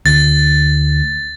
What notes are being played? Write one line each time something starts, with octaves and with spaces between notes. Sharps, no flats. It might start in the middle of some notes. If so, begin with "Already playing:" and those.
D2 A6